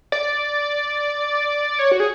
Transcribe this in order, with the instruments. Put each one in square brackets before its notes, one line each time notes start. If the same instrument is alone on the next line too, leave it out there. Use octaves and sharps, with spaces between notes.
[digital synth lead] D5
C#5
F#4
G#4